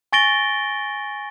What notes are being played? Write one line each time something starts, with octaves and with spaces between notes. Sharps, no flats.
G#5 C#6 A6 A#6 D7 G7